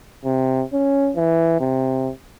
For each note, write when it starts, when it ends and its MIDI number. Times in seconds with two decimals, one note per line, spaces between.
0.25 0.63 48
0.73 1.11 61
1.16 1.59 52
1.60 2.11 48